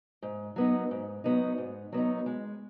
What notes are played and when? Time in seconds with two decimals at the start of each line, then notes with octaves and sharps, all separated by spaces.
0.22 G#2
0.56 F#3 B3 D#4
0.91 G#2
1.24 F#3 B3 D#4
1.58 G#2
1.92 F#3 B3 D#4
2.26 G#3